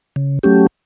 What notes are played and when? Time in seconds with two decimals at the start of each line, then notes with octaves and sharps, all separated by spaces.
0.16 C#3
0.43 F#3 A3 C#4 G4